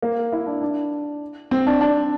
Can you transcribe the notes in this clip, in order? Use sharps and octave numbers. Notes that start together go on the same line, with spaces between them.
A#3
E4
D4
D4
C4
D4
D4